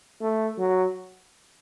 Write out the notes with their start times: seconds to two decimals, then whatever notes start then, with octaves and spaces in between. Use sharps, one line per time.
0.21 A3
0.58 F#3